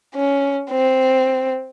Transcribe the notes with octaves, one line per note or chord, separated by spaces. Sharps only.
C#4
C4